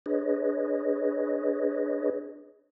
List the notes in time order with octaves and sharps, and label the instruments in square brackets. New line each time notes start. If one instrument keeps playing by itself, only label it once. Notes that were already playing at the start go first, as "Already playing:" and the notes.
[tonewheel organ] D4 G#4 B4 C#5 D#5